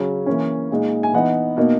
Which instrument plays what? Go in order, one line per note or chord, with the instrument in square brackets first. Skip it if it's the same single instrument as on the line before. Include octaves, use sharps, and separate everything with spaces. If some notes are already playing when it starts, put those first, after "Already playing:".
Already playing: [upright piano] C#3 F#3 C#4
E3 A#3 C#4
A#2 G#3 D#4
G#5
E3 B3 D#4 F#5
B2 A#3 D#4